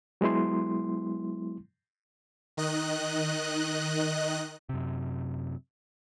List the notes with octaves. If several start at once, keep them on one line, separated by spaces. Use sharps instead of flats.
F#3 G#3 B3 E4 C6
D#3 D#5 F#6
F#2 C3